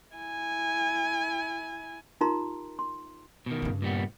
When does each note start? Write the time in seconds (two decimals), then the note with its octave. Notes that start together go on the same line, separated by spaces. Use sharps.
0.16 E4 G#5
2.21 D#4 F4 G4 A#4 A#5 C6
2.79 C6
3.46 B2 D#3
3.62 G2 C#3
3.82 A#2 G3 B3